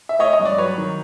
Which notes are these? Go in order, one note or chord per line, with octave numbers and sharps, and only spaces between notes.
E5
A3 C#5 D#5
D#5
G2
D5
F#3 B4 C#5
D#3